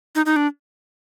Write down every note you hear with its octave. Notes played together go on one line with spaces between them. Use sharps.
D#4
D#4
D4